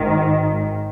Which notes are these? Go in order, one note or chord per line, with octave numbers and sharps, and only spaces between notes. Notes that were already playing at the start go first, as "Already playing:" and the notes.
Already playing: G#1 G#2 D#3